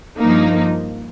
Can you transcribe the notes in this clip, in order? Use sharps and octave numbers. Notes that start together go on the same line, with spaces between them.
G2 F3 A#3 D#4